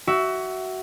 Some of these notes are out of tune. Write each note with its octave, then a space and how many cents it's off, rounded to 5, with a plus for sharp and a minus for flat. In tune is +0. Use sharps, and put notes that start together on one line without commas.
F#4 +20 E5 +0